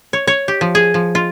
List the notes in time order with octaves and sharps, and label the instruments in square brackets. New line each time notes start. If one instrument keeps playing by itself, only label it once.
[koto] C#5
C#5
G4
F3
G#4
F3
F4